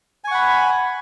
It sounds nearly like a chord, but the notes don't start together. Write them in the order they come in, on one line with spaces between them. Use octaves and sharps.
G#5 C#6 F#5 B5